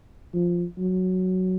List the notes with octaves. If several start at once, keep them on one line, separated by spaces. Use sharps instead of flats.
F3
F#3